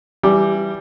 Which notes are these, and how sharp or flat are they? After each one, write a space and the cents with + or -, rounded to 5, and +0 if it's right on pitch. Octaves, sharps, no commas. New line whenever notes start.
E3 +15 G3 +0